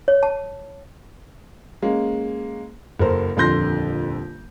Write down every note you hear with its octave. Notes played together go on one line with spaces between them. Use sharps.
C#5
A5
G#3 A#3 C#4
F#1 A4 A#4 C5
D#1 F2 D3 C6 G6 A#6